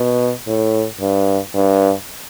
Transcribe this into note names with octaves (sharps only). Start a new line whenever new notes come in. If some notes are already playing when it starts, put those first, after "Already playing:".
Already playing: B2
A2
G2
G2